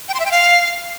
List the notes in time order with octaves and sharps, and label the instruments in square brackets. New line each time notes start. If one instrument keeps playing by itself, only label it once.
[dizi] G5
C6
E5
G5
F5